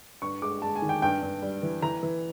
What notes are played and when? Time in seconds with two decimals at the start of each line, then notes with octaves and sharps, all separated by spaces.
0.22 G2 C#6
0.42 G#3 D6
0.62 G#3 A5
0.76 G#5
0.82 D#3
0.89 G5
1.02 G2 G5
1.23 G2
1.42 G3
1.63 E3
1.82 E3 A#5
2.03 E3